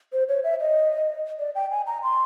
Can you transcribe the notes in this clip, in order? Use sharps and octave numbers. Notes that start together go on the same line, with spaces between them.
C5
C#5
E5
D#5
D5
G5
G#5
A#5
C6